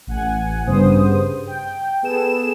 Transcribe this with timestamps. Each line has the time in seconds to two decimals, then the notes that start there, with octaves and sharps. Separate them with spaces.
0.07 A1 F#5 G#5
0.67 G2 C#3 B3 C5 D#6
1.47 G5
2.03 B3 G#4 A4 E7